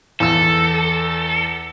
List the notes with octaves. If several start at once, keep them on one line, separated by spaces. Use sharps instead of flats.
E2 A4 E6